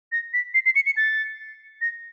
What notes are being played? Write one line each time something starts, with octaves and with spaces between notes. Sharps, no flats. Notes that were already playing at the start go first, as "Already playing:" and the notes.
A#6
B6
C7
C7
C#7
C#7
A6
A#6